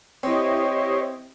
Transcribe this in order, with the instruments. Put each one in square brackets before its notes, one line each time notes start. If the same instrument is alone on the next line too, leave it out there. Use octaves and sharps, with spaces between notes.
[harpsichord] C4 [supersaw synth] E4 G4 D#5 [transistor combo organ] C5 C#5